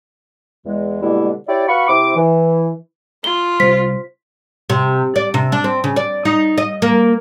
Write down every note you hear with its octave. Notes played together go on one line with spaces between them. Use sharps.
E2 G#3
B2 D3 G3 G#3 A#3 E4
E4 G4 C#5 D5
F#4 B4 F5 B5 C#6
C3 C4 E4 D6
E3
F4 G7
C3 G3 C5 B6
C3
D5
C3
D4
C4
C#3
D5
D#4
D#5
A#3